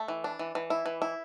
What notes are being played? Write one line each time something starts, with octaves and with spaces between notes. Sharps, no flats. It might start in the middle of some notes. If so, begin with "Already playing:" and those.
Already playing: A3
E3
D4
E3
E3
E4
E3
E4